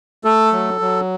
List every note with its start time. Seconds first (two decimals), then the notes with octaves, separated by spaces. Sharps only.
0.25 A3 A4
0.53 F#3
0.81 F#3